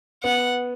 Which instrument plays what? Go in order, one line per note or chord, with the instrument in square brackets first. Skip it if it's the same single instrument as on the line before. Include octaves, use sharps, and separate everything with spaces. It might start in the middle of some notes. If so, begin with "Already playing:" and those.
[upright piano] B3 [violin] F#5